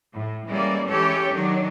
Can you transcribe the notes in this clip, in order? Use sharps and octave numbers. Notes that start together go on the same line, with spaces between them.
A2
E3 G3 G#3 A#3 C#4 D5
E3 G#3 C#4 G4 A4 C#5
D#3 F#3 D4